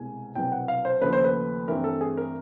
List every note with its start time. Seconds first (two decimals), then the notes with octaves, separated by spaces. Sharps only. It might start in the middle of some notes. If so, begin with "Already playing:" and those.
Already playing: C2 B2 G#3 G#5
0.35 C2 B2 F#3 B3 G5
0.52 F#5
0.68 F5
0.85 C5
1.01 D#2 C#3 F3 A3 B4
1.13 C5
1.24 B4
1.68 G2 E3 A3 C4 A#4
1.84 A4
2.01 G#4
2.17 A#4